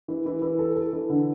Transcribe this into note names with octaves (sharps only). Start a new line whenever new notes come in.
E3
E3
E3
A4
A4
E3
D3